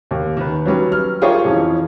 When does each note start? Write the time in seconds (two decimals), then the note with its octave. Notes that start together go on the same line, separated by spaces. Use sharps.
0.11 D#2
0.37 D#3 B4
0.66 F#3 G3 C#4 B4
0.92 F6
1.22 F4 G4 G#4 A#4 C#5
1.45 F2 E3 F3 C#4